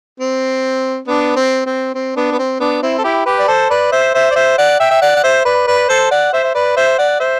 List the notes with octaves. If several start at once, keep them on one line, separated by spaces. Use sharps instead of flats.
C4
B3 D4
C4
C4
C4
B3 D4
B3
C4
B3 D4
C4 E4
A4
E4 G4
G4 B4
D5
A4 C5
B4 D5
C5 E5
C5 E5
D5
C5 E5
D5 F#5
E5 G5
E5
D5 F#5
F#5
C5 E5
B4 D5
B4 D5
A4 C5
D5 F#5
C5 E5
E5
B4 D5
C5 E5
D5 F#5
C5 E5